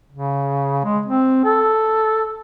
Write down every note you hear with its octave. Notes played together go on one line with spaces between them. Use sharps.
C#3
G#3
C4
A4